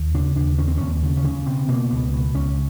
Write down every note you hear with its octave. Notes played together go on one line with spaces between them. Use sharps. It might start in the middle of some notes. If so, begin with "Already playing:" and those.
Already playing: D#2
C#3 D4
D#2 D4
D#2 C#4
C4
D#2 C#4
C#3
C#4
C#3
B2 C4
B2 A#3
C#2 B3
B2
C#2 C#4